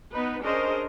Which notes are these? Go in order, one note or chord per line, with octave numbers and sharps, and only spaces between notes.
B3 D#4 B4
C#4 D4 G#4 A#4 C5 D#5